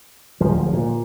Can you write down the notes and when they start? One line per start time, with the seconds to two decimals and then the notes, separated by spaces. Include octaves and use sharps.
0.40 D1 F3
0.73 A#2